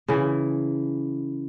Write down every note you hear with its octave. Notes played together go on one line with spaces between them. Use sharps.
C#3 E3